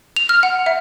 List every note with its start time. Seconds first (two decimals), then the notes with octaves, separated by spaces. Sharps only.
0.16 F7
0.29 F6
0.43 F#5
0.66 E5